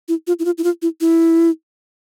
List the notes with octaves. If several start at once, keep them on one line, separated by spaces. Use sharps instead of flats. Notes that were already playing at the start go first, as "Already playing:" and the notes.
E4
F4
E4
F4
E4
F4
E4
E4